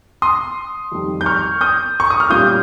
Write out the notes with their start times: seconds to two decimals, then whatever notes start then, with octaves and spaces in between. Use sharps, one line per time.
0.22 C6 D#6
0.92 F2 D#3 G3
1.21 G6
1.26 C#6 F6
1.61 D#6 G6
2.00 C#6
2.10 D#6
2.20 F6
2.30 A#2 G3 C#4 F4 D#6 G6